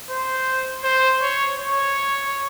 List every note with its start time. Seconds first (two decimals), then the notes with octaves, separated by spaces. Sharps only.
0.10 C5
0.84 C5
1.22 C#5
1.59 C#5